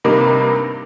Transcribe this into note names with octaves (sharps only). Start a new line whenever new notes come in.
G2 C3 A#3 D#4